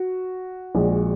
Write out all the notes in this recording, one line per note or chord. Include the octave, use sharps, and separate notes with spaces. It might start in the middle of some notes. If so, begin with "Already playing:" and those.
Already playing: F#4
A#1 A#2 G#3